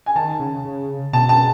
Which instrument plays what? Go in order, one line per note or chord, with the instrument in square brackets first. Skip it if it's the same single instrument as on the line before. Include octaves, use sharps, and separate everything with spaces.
[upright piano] G#5
[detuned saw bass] D#3 [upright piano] A5
[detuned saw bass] C#3
C#3
[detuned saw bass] B2 [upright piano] A5
[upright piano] A5